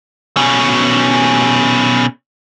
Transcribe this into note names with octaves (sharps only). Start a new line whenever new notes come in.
B2 C#4